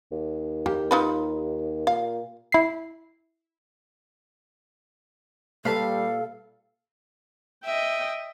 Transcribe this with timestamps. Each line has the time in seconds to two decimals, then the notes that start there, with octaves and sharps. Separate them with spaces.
0.11 D#2
0.66 A#3 G4
0.91 D#4 F4 B4
1.87 A#2 F5
2.52 E4 C7
5.65 A#2 G3 A4 B4 F5 A5
7.64 D#5 E5 G5